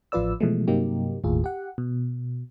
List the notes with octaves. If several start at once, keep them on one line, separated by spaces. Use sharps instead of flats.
A1 F3 F4 B4 D5 E6
B2 E3 F3 G#3 A3
G2 C3 F#3 A#3 D#4 G4
G1 D#2 A2 F4 G#4
G4 F#5
B2